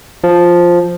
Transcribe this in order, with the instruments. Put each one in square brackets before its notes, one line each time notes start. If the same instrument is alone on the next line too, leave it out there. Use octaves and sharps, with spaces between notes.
[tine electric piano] F3